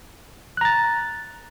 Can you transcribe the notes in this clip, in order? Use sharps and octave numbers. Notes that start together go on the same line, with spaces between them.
A#5 F#6 A6